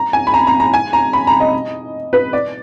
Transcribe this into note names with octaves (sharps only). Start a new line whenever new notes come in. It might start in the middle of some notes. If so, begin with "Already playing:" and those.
Already playing: A#5
G#5
B5
A#5
A#5
A#5
G#5
A#5
B5
A#5
D#5
B4
D5